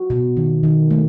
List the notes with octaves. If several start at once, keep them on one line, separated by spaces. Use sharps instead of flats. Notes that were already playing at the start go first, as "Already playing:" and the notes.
Already playing: F#4
B2
D#3
D#3
A3